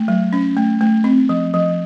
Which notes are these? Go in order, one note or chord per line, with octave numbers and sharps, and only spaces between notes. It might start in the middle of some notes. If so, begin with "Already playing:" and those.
Already playing: A3
F#3
C#4
A3
A3
C4
F3
F3